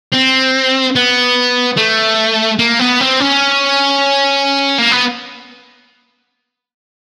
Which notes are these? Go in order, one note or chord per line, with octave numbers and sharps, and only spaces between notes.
C4
B3
A3
A#3
B3
C4
C#4
A#3
B3